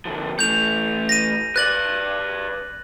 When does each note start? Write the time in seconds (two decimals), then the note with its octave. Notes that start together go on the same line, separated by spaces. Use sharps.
0.05 D3 F3
0.39 E3 A3 G6 F7
1.09 A#6 D#7
1.56 B4 D5 F#6 A6 F#7